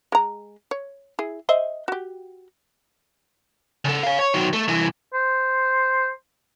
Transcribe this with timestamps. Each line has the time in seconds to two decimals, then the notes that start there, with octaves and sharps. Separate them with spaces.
0.12 G#3 A#5
0.71 C#5
1.19 E4 G#4
1.49 C5 D#5 E5
1.88 F#4 G4
3.85 C#3 A4
4.03 C#5 F5
4.20 C#5
4.34 D#3 F#3
4.53 A3
4.68 C2 E3
5.14 C5